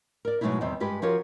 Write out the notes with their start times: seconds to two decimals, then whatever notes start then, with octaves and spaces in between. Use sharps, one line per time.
0.25 A#4 D5
0.41 B2 F#3 G#3 A3 D#4 E4
0.61 E2 D#3 G3 C4
0.80 G2 G#3 G4 B4
1.02 F3 F#4 G4 A#4 C#5